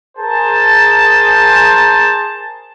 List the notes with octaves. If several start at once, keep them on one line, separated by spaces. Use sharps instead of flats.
G#4 A#4 C5 G#5 A5